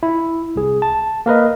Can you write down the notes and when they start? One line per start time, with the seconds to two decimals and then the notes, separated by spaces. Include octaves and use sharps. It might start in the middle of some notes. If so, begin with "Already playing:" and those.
0.03 E4
0.56 C2 G#4
0.82 A5
1.26 A#3 A#4 B4 D#5